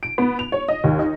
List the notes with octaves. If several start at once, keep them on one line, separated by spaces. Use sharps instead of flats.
D7
B3
F7
C#5
D#5
D#2
D#4